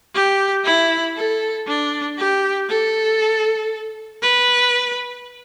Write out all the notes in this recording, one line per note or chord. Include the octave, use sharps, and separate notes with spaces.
G4
E4
A4
D4
G4
A4
B4